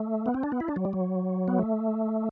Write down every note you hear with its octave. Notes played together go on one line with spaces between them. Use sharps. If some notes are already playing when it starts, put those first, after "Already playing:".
Already playing: A3
B3
C4
D4
B3
E4
D4
F#3
G3
F#3
B3
A3